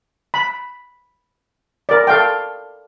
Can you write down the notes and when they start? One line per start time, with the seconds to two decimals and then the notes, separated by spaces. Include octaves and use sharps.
0.34 B5
1.89 A#4 D5
2.07 A4 F5 G5